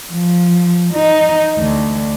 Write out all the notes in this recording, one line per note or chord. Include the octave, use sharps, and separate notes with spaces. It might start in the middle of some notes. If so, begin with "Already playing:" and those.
F3
D#4
D2